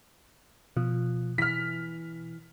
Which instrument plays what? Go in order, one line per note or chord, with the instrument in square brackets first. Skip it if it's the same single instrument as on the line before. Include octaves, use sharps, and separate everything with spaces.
[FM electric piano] B2 [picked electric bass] F3
[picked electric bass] E3 [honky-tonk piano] F6 B6